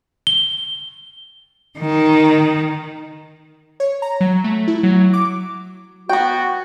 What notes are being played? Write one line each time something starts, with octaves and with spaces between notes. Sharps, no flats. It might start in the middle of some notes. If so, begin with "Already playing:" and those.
G7
D#3
C#5
A#5
F#3
A3
E4
F#3
D6
B3 F#4 G5